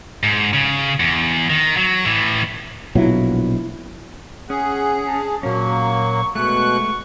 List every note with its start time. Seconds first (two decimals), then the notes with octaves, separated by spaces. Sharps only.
0.23 G#2
0.54 C#3
1.00 E2
1.50 D#3
1.77 F#3
2.05 A2 E3
2.95 A#1 B2 F#3 E4 F4
4.50 C#4 G#4 F#5
5.08 A5
5.43 A#2 F#3 A#3 C#4 C#6
6.35 B2 G#3 A3 C#6 F#6